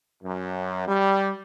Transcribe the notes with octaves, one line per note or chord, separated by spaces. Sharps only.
F#2
G3